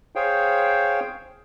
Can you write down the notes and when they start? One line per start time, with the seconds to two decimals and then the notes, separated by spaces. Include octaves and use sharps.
0.16 G#4 C5 C#5 F5 G5